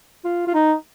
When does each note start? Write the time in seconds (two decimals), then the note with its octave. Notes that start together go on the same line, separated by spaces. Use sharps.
0.25 F4
0.47 F4
0.54 D#4